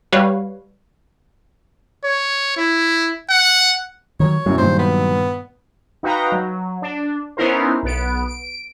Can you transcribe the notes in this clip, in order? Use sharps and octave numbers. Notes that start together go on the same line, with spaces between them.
G3 F#4 B4 C#5 F5
C#5
E4
F#5
D#3 F#3 C#5
E1 F#2 F#3
G2 A#2 D#3 C5
B3
D#4 F#4 B4 F5 G5 A#5
F#3
D4
B3 C#4 D#4 E4 A#4 C5
B1 B3 D7
D7